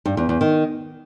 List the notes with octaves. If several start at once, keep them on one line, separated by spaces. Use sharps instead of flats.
G2
E2
E2
D#3